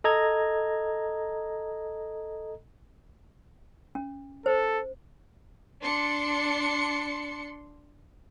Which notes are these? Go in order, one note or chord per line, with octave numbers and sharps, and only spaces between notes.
A4 D#5 A#5 G#6
C#4
A4 C5
D4 C6 C#7